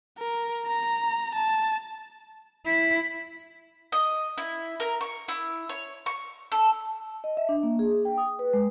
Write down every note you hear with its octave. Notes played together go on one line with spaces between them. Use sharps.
A#4
A#5
A5
E4
D#5
E4
A#4
C#6
E4
C#5
C#6
A4
D#5
E5
D4
A#3
G#4
G#4
G5
D#6
B4
G#3